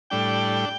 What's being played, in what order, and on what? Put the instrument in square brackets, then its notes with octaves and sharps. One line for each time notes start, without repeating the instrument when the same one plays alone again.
[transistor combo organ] A2 G3 D4 G5